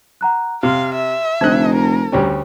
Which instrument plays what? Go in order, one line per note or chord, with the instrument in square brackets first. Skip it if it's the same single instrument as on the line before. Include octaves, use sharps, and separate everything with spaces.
[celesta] F#5 A#5 F#6
[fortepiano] C3 [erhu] F5 [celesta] C6 F6
[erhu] E5
[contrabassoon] F1 [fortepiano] D3 F#6 [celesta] C5 A5 G#6
[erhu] A#4
[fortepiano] D2 G3 C#4